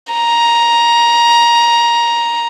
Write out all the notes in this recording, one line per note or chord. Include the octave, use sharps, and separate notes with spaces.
A#5